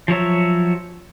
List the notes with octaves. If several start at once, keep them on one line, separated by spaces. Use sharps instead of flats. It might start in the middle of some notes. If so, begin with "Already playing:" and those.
F3 F#3 C#5 E5